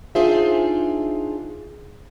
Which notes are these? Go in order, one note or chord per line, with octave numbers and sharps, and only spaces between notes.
D4 D#4 F4 G#4 C5 E5